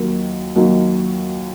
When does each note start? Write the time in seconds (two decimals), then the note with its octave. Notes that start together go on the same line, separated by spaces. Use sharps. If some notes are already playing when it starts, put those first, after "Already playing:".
Already playing: D#2 D#3 F#3
0.55 D#2 D#3 F#3